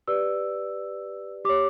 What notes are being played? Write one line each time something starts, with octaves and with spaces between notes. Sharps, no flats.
G4 B4 D5 E6
G4 C#5 D6